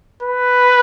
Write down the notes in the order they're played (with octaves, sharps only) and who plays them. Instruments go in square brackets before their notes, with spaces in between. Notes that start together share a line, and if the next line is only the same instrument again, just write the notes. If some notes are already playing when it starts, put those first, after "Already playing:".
[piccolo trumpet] B4